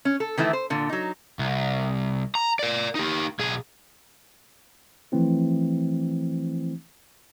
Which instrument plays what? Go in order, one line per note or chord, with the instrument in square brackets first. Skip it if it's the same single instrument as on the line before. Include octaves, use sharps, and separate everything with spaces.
[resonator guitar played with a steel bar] C#4
A4
D#3 E3 A3 E4
C5
A#2 D3
F#3 D#4
[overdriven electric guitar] C2
A#5
A#4 D5
D#4 G4
B1 G#4
[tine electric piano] E3 F3 A3 C4 E4